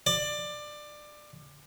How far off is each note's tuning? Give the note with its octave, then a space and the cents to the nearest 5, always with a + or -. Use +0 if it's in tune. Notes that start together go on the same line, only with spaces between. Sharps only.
D5 +20